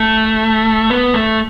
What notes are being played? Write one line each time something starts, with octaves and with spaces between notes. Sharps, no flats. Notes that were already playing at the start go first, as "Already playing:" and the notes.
Already playing: A3
B3
A3